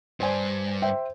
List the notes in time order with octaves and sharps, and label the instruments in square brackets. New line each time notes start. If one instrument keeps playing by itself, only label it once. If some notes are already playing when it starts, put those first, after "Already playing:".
[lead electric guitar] G2 [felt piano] C5 D5 G#5
[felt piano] C5 E5 G5